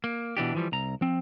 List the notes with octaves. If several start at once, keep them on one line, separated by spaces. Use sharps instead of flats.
A#3
B2 E3 D4 G4
E3 F3 G3
C2 A#5
F3 C4